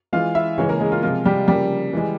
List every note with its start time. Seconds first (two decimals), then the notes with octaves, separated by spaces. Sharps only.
0.13 E3 G#3 F4 F5
0.35 E4 E5
0.58 C#3 E3 G#3 C#4 C#5
0.69 A#3 A#4
0.80 G#3 G#4
0.92 F4
1.03 C3 F3 G#3 F4
1.25 G3 G4
1.47 C#3 F3 G3 A#3 G4
1.93 E3 G#3